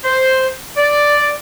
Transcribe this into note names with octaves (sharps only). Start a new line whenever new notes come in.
C5
D5